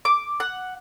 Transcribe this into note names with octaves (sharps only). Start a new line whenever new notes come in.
D6
F#5